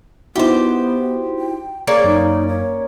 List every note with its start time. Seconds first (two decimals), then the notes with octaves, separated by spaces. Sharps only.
0.36 B3 D#4 E4 F#4 G4 C5
1.39 G5
1.87 A#3 C#4 G#4 D5
2.04 F#2 D#4
2.48 C#5